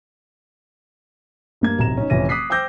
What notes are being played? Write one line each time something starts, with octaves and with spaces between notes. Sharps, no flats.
G2 A#3 G#6
D1 B1 C3 A#5 E7
C#4 D#4
F1 E3 C#4 A#6 D#7
D6 D#6 F#6 B6 C7
C5 G5 D6 E6 G6 A#6